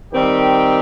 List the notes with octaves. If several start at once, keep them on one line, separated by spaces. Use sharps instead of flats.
D#3 G3 C4 G4